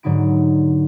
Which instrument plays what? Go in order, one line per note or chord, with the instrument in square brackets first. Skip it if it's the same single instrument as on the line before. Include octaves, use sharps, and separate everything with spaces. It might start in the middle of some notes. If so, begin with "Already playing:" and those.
[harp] G#2 D3 F#3 D#4 B5 D7